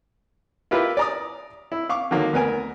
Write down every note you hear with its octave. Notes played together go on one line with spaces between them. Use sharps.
E4 F4 G4 A#4 B4 E5
D5 A#5 D#6
E4
F5 C#6 D6
D3 D#3 F#3 A#3
D2 B3 A#4 G#5